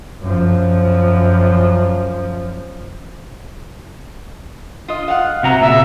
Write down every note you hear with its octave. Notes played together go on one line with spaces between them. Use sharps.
F#2 F3
F4 D#5
F5 F#5
C3 F#4 A#5
A#2 C#3 E5